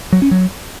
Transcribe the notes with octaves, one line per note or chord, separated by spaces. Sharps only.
F#3
C#4
F#3